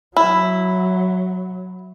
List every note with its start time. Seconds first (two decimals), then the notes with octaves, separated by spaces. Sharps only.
0.17 F#3 E4